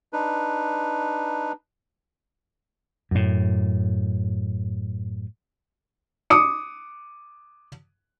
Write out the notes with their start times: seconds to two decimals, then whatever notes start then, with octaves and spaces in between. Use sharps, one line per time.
0.13 D4 D#4 B4
3.11 F#2 A2
6.30 D6 D#6 C#7